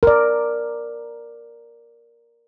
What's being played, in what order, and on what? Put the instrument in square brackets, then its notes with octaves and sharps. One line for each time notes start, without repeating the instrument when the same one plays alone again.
[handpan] A#4 D5